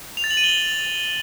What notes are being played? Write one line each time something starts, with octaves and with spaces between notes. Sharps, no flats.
F7
A6
F#7
D#7
G7